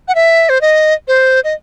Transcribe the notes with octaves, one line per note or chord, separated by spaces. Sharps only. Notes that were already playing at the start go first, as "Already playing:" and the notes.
F#5
E5
C5
D#5
C5
D#5